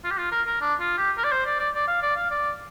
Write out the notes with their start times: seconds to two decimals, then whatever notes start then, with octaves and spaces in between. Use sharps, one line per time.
0.04 F4
0.11 G4
0.18 F4
0.32 A#4
0.47 A#4
0.61 D4
0.80 F4
0.97 G4
1.18 A#4
1.24 D5
1.32 C5
1.45 D5
1.59 D5
1.74 D5
1.88 F5
2.02 D5
2.16 F5
2.31 D5